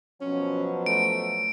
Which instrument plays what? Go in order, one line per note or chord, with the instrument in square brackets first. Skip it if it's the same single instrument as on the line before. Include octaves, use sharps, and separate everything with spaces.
[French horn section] B2 F3 F#3 [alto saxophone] C#4
[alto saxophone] A3 [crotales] D7